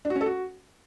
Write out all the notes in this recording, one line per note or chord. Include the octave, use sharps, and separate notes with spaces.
D4
F#4
C#4
A4
F#4